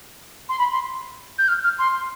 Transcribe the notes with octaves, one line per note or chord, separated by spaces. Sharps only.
C6
B5
C6
G6
F6
F6
C6